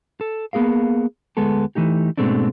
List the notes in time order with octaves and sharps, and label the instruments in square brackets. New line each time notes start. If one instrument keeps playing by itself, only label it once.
[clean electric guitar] A4
A#3 B3 G#4 A#4 F5
D2 G#3 B3 A4
E3 A3 D#4 G4
G#2 B2 G#3 A3 C4 D4